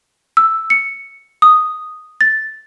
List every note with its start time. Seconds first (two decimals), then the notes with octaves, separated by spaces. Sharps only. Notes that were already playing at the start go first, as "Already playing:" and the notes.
0.37 E6
0.70 C#7
1.42 D#6
2.21 A6